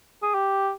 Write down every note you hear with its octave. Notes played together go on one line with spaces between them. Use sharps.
G#4
G4